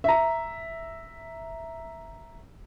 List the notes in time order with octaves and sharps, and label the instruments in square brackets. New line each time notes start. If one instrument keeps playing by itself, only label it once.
[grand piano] E5 A#5